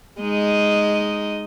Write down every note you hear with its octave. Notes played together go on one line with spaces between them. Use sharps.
G#3 D#4 D#5